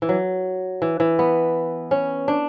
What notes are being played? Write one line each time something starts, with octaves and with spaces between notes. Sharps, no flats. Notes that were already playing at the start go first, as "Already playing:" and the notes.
E3
F#3
E3
E3
B3
C#4
D4